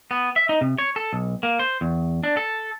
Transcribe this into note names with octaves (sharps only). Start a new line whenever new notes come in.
B3
E5
D#4
C3
C#5
A4
B1
A#3
C5
E2
D4
A4